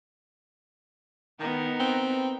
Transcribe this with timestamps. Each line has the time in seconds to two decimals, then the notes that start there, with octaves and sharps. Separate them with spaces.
1.39 D#3 B3 D#4 A#4
1.80 C4